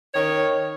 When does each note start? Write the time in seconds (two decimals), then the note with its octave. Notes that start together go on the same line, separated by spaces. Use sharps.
0.14 D#3 C#5